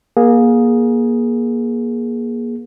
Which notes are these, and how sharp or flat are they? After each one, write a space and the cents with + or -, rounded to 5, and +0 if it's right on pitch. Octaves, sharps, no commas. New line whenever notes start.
A#3 +30 G#4 +0